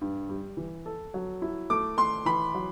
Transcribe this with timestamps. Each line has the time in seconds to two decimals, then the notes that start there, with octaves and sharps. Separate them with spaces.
0.01 G2
0.29 G3
0.57 E3
0.86 A4
1.14 F#3
1.42 E4
1.70 A3 D6
1.97 A3 C6
2.26 E3 B5
2.54 F#3